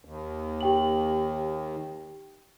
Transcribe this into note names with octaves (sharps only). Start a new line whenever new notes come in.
D#2
G4 G5 F#7